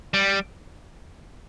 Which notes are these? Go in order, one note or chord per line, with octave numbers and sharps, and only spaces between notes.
G3